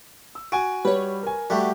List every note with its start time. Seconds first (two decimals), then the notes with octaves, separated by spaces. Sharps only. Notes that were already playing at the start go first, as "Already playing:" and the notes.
0.35 E6
0.52 F#4 G#5 D7
0.85 G3 B4 C#5
1.23 A#4 G#5
1.50 G3 A3 F#4 G4 F#5